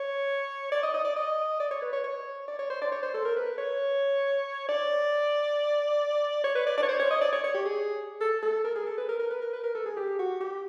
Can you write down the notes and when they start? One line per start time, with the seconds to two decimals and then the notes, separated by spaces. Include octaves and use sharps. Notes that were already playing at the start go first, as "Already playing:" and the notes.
Already playing: C#5
0.72 D5
0.83 D#5
0.94 D#5
1.05 D5
1.16 D#5
1.60 D5
1.71 C#5
1.82 B4
1.93 C#5
2.04 C#5
2.48 D5
2.59 C#5
2.70 C5
2.82 D5
2.92 C#5
3.03 C5
3.14 A4
3.25 A#4
3.36 B4
3.58 C#5
4.69 D5
6.44 C#5
6.55 B4
6.67 D5
6.78 D5
6.83 C#5
6.89 C5
6.99 C#5
7.11 D#5
7.21 D5
7.33 C#5
7.44 C#5
7.54 G4
7.65 G#4
8.21 A4
8.43 A4
8.64 A#4
8.75 G#4
8.86 A4
8.98 B4
9.09 A#4
9.19 A#4
9.31 B4
9.42 A#4
9.53 B4
9.64 A#4
9.75 A4
9.86 G#4
9.97 G4
10.19 F#4
10.40 G4